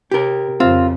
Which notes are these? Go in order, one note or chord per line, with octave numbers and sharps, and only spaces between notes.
C3 G4 A#4
F2 C#3 C4 F4